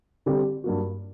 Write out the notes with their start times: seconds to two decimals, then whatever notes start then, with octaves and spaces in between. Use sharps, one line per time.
0.26 D3 G3 C4 G4 D5
0.64 G2 F#3 A#3 F#4